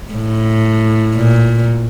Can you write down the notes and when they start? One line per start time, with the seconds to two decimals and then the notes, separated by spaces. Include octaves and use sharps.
0.13 A2
1.16 A#2